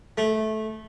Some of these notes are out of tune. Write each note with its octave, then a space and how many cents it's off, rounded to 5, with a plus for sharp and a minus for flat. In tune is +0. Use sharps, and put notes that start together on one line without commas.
A3 -15